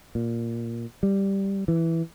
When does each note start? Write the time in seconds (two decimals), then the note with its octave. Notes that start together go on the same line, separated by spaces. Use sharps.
0.15 A#2
1.03 G3
1.68 E3